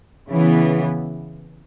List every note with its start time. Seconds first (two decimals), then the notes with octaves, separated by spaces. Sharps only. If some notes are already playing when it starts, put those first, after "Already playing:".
0.28 C#3 E3 B3